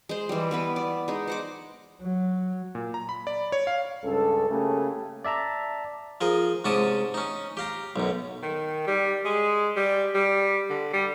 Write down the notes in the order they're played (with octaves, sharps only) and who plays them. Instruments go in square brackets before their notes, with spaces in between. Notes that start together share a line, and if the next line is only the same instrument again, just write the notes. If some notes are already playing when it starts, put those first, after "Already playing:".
[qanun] G#3 C5
E3 G3
E3 B3 B4
D5
G#3 D#4
C5 F#5 D6
[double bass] F#3
[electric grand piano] A#2
A#5
B5
D5
C#5
F5
[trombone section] C#2 G2 C#4 A4
C#3 A3 A#3 C#4 G4 A4
[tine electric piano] D5 E5 A5 A#5
[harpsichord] F3 G#4 A#4
G#2 C3 C#4 A5 D6 D#6
C#4 D#4
G4 F5 A#5
B1 F#2
[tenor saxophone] D#3
G3
G#3
G3
G3
D3
G3